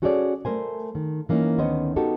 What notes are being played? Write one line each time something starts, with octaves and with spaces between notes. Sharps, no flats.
C#4 F#4 G#4 A4 C#5 D5
A3 A#4 C5 G#5
D#3
E3 A#3 C#4 D#4
D2 D#3 B3 C#4 C5 D#5
B3 D#4 F#4 G4 A4 A#4